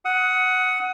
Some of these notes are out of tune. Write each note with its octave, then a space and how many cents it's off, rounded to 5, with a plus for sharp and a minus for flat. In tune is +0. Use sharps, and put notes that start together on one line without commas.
F#5 +0 D#6 +25